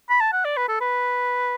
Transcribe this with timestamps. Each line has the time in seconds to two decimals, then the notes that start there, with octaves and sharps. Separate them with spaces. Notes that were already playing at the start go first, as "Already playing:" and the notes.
0.10 B5
0.21 A5
0.33 F#5
0.45 D5
0.57 B4
0.68 A4
0.81 B4